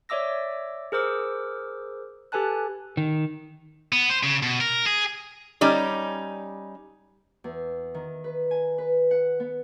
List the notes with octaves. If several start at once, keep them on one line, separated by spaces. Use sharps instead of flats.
C#5 D5 E5 D6 E6 A#6
G#4 A#4 C5 D6 E6
G4 A4 B4 G#5 A5 F#6
D#3
B3
C5
C#3
B2
A#4
G#4
G3 C#4 D#4 D5
E2
D#3
B4
G#5
B4
F#5
B3